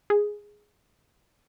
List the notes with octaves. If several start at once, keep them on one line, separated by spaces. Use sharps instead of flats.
G#4